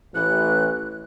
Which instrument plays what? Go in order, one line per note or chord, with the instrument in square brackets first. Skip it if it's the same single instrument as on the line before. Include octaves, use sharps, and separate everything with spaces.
[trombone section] A1 E3 [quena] F#6